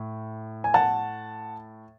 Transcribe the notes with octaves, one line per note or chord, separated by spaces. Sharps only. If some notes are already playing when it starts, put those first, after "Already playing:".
Already playing: A2
G#5
F#5 A5